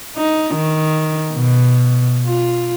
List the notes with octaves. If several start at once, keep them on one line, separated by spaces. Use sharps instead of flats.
D#4
D#3
B2
F4